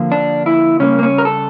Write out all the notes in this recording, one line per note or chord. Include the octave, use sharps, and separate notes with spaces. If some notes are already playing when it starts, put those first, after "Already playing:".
Already playing: D3 F3 A#3
D4
E4
C#3 G3 A#3 C#4
A#3
C#4
A#4
A4